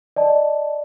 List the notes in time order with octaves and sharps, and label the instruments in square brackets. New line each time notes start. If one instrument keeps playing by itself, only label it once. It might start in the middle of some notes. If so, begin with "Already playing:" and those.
[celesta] D5 D#5 A5